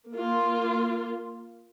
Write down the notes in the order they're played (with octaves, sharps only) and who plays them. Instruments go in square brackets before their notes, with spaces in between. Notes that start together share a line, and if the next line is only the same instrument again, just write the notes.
[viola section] A#3 F4